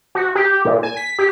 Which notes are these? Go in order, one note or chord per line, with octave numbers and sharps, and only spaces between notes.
F#4
G4
A#2
G#5
B6
G4